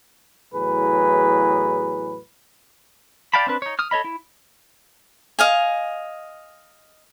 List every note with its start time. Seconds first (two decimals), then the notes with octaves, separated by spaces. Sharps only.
0.54 E2 A2 F#3 G#4 B4
3.34 D5 F5 G5 A5 B5
3.47 C4 D4 B4
3.62 D#4 C#5
3.79 D#6 F6
3.91 A4 C#5 D#5 B5
4.04 E4
5.39 D#5 F5 G#5